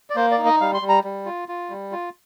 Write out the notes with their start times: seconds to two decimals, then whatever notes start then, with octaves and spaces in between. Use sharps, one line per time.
0.10 D5
0.16 A#3 C5
0.31 D5
0.38 D#4
0.45 D#5
0.61 G3 F5
0.74 C6
0.82 G3
0.89 A#5
1.04 G3
1.26 F4
1.48 F4
1.70 G3
1.92 F4